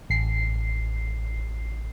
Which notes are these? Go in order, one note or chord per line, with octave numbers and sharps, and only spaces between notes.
A1 C7